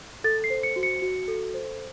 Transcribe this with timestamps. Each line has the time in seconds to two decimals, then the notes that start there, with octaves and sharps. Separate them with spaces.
0.24 A4 A6
0.44 C7
0.50 C5
0.63 C#7
0.76 F#4
0.83 C#7
1.02 F#4
1.28 A4
1.54 C5